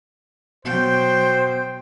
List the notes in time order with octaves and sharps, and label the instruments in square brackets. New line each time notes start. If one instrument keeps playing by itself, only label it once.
[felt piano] B2 [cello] F#3 G5 [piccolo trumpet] C5